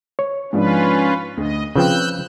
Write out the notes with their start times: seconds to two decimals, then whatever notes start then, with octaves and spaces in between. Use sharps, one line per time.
0.19 C#5
0.53 G#2 F3 C#4 D4 F4 B4
1.37 D2 D#5
1.76 C#3 F3 C4 B4 G5 E6 F#6 G6